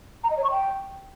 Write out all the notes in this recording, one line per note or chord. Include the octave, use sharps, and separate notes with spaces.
A#5
D#5
C#5
C#6
G5